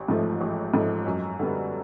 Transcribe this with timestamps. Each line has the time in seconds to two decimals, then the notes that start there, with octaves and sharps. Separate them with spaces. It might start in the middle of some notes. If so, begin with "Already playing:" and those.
Already playing: A1
0.08 G#2 F3 A3
0.41 A1
0.74 G#2 F3 A3
1.06 F#2
1.39 D3 G3 B3